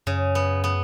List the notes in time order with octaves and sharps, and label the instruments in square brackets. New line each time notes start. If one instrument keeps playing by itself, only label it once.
[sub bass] F#2 [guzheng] C#3
[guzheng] B3
B3